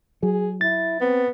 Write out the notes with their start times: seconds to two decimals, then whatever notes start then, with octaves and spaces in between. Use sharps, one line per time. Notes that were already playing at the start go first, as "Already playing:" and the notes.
0.23 F#3 G#4
0.61 E4 A6
1.01 B3 C4